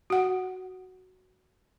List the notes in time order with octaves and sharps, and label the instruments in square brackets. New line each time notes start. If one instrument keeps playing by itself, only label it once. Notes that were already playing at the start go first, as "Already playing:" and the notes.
[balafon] F#4 F#5